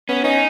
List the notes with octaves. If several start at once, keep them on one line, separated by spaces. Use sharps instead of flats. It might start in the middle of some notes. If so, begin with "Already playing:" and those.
B3 C#4
C#4 D#4